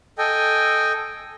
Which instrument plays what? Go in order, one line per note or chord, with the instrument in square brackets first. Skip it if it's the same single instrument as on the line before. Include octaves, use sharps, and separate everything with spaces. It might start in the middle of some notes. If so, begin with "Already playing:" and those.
[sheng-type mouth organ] A4 D#5 G5 G#5